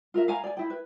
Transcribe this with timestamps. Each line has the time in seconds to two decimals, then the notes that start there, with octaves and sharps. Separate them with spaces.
0.14 F4 A#4 E5
0.28 F5 G#5 A#5
0.44 D5 G#5
0.57 E4 G5
0.70 B4